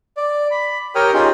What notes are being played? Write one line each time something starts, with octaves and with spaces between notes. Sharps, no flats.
D5
B5
G4 A#4 C#5 G5 D#6 F6
C#4 D#4 F4 G4 G#4